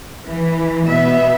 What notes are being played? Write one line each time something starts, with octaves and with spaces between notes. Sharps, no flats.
E3
B2 B3 E5